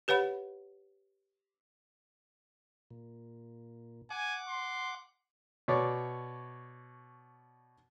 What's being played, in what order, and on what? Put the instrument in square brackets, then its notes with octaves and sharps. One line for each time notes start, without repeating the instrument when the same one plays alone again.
[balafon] G4 B4 C#5 F#5 B5
[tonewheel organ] A#2
[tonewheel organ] F#5 D6 [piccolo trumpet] G#5
[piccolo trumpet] C6
[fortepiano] B2 C#5 D5 C#6